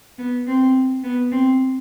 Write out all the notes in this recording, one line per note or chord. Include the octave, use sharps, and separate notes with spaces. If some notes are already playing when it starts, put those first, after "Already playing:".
B3
C4
B3
C4